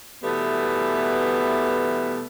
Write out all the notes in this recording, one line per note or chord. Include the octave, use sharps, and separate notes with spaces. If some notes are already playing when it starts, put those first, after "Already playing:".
B2 E3 G3 A3 B3